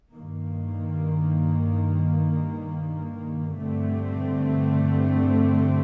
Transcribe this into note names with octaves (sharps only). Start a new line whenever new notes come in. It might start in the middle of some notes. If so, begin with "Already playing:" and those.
G2 D#3 A#3
G2 D3 A3 C4